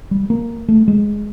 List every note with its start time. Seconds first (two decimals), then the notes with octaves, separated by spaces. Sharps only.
0.11 G3
0.30 A#3
0.68 A3
0.88 G#3